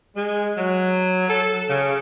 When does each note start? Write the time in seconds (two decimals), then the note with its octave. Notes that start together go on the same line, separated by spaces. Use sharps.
0.15 G#3
0.57 F#3
1.28 A4
1.69 C#3